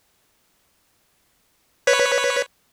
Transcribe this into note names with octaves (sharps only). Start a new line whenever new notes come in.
B4 C#5 B6